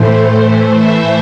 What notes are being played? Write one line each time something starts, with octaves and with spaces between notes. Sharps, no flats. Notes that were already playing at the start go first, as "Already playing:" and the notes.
Already playing: A2 E3 A3 C5
C5
E5